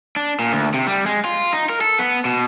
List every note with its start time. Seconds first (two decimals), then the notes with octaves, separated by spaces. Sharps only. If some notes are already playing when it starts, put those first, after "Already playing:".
0.16 D4
0.39 A#2
0.53 D2
0.74 C3
0.87 G3
1.06 G#3
1.25 F4
1.53 D#4
1.69 A#4
1.81 A4
1.99 B3
2.25 B2